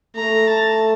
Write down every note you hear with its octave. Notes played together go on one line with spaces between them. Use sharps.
A3 A#5
A5